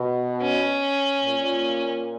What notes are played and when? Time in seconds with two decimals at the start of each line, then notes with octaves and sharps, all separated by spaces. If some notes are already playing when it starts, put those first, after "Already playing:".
Already playing: B2
0.41 C#4
1.23 A#2